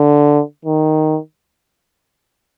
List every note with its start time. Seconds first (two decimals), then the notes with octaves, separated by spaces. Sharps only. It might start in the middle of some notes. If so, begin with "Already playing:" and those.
Already playing: D3
0.65 D#3